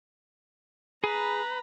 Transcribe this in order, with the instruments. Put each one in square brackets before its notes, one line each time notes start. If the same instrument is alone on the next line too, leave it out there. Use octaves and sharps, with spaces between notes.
[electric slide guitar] G#4 [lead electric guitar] B4 [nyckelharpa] A#5 B5